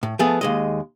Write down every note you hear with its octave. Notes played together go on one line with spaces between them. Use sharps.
A2
F3 A3 B3 G#4
D#2 G#3 D#5